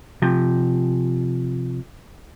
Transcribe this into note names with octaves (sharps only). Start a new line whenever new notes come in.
C3 F3